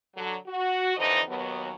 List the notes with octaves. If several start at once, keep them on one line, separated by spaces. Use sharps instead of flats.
D3 F#3
F#4
F2 D3 E3 D#4 C5 D#5
D#2 F#3 B3